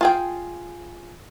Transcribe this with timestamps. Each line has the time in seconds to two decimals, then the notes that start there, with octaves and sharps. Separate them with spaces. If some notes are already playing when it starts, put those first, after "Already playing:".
0.01 F4 G#4 G5